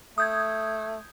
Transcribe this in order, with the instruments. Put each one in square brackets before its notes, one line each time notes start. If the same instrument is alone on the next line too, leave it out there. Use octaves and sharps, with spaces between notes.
[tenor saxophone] A3 [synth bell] D#6 G6 G#6